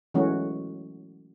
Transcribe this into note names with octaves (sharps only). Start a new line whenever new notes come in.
E3 F#3 G#3 A3 C#4 F#4